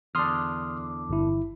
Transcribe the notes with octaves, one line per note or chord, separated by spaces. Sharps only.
E2 D3 D4 C6 D#6 F6
G1 E4